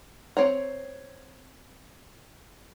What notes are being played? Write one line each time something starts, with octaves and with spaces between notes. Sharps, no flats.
C4 C#5 A#5